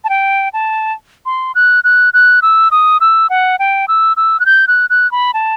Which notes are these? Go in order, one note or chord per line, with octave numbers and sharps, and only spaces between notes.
A5
G5
A5
C6
F#6
F#6
F#6
E6
D#6
E6
F#5
G5
E6
E6
F#6
G6
F#6
F#6
B5
A5